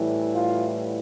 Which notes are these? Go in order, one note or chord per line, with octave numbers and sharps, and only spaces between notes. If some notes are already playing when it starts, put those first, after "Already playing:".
Already playing: A2 E3 G3
F4